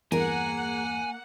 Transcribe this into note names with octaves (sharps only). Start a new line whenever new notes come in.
E2 G2 A#3 G#4 A#4 F#5 G#5